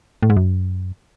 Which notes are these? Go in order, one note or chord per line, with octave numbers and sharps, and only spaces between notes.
A2
G#2
F#2